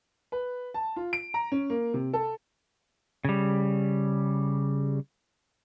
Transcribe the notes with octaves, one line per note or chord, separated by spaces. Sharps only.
B4
A5
F4
D7
A#5
C#4
A#3
C3
A4
C#3 G3